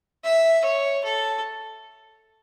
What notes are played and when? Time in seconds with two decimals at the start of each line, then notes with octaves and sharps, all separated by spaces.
0.24 E5
0.64 C#5
1.04 A4